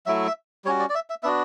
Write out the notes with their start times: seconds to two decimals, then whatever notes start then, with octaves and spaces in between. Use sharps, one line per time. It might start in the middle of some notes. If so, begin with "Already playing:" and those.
0.06 F#3 A3 E4 E5
0.27 E5
0.65 G3 C#4 F#4 C#5
0.79 D5
0.90 D5
0.95 E5
1.10 E5
1.23 B3 D4 F#4 E5